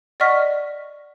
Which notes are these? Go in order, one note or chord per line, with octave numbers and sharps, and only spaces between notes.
D5 D#5 F#5 C#6 F6 B6